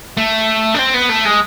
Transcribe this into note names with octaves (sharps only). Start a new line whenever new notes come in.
A3
D4
C4
B3
A3
G#3